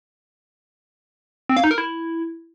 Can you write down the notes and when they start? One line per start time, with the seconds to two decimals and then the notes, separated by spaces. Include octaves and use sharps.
1.49 C4
1.57 F5
1.64 D#4
1.71 A#4
1.78 E4